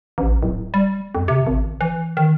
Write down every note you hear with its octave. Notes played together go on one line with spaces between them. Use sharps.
A1
D1
G3
F2
C3
G#1
E3
D#3